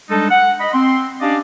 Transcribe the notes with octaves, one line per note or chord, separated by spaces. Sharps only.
G3 G#3 D4 D#4 A4
F#5
D#5 B5
C4 C6
C#4 D4 G4 D5 D#5 F5